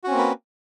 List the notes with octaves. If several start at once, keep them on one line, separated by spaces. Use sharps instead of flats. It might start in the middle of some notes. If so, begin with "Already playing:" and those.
A#3 C4 C#4 F#4 B4